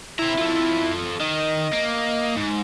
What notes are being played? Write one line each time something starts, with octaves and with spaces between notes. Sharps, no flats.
C4 E4 A#5
F4 A4
D#3 D#5
A#3
G#2